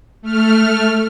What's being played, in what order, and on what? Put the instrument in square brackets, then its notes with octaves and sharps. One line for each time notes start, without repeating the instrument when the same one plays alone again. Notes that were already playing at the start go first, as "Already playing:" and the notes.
[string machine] A3 F6